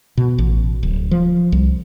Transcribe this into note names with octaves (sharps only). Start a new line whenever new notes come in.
B2
A1
D1
F3
C2